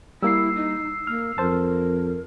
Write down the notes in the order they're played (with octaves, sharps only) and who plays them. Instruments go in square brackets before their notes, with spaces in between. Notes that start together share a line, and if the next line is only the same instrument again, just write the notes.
[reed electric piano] G3 A#3 [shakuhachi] E4 [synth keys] E6 C7
[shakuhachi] D#4
[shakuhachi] A#3 [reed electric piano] F6
[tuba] F2 [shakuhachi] A#4 [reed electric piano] C5 A5